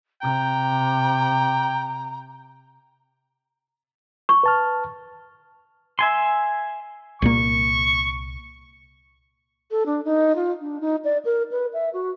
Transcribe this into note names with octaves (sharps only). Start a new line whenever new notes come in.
C3 G5 A#5
C#6
B4 A5 F6
E5 G#5 C6
C2 A#2 A#3 C#6
A4
D4
D#4
F4
D4
D#4
D5
A#4
B4
E5
F#4